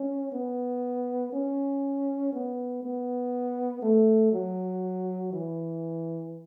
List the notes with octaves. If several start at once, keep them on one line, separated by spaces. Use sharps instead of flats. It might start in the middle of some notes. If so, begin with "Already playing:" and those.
Already playing: C#4
B3
C#4
B3
B3
A3
F#3
E3